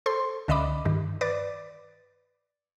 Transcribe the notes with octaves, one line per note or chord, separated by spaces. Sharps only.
A4 C5 C6
C#2 D3 D#5 E5 B5 D6
G2 D#3
B4 D5 D6 A6